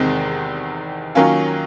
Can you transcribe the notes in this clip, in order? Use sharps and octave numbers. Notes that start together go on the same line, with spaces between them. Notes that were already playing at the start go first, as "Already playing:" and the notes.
Already playing: E2 C3 D#3 G#3 C4
D#3 F#3 A#3 C#4 F4